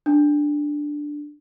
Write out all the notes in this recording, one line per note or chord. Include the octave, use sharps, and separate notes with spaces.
D4